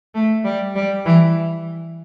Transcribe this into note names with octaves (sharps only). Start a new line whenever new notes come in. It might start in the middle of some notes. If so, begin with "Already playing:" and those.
A3
G3
G3
E3